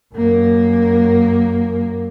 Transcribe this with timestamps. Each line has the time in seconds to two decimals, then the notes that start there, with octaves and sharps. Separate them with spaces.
0.15 F#2 A#3